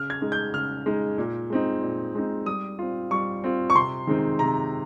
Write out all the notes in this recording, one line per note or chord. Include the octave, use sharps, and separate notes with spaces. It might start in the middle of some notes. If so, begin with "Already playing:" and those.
Already playing: C#3 F6
G#6
G#3 D#4
G6
C#3 F6
G#3 D#4
A#2
G#3 C4 D#4
A#2
G#3 C4 D#4
G3 D#6
C4 F4
G3 C#6
C4 F4
C#6
C3 C6
D#3 G#3 C4 D#4
C3 A#5